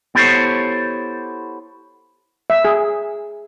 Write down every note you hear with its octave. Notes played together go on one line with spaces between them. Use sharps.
B3 E4 G4 A4 C5 C#5
E5
G#4